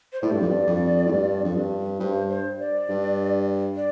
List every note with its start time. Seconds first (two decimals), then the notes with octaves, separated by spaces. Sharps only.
0.13 C5
0.22 A2 D5
0.31 G2
0.40 F2
0.48 G2
0.67 F2
1.06 A2
1.11 G2
1.44 F2
1.55 G2
2.00 G2 C5
2.29 C5
2.59 D5
2.89 G2
3.76 D5